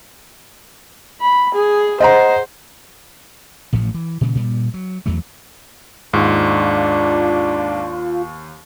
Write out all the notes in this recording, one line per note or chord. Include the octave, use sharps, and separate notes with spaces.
B5
G#4
C5 D#5 F#5 A#5
A1 A2 C3 F3
E3
A#2 C#3 E3 G#3
G2 A#2 G3
F#3
E2 E3 F#3 A3
D#2 G#2 D4 F4